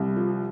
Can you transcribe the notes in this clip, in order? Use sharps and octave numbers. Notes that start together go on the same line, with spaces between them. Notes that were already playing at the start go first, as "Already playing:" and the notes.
Already playing: C2
F3